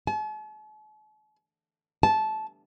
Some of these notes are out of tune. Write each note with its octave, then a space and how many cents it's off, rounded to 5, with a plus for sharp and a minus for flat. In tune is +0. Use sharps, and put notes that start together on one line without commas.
A5 -45
A5 -15